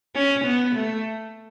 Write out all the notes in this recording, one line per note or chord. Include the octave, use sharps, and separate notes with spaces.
C#4
B3
A3